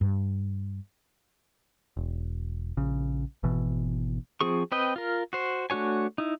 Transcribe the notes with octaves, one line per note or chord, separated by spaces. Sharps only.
G2
E1
A#1 C#3
G#1 B2 E3
F3 C4 G#4 C#6
C4 B4 D#5 G5
F4 A#4
F#4 C5
A3 D4 F#4 C#5 G#5
D#4 E4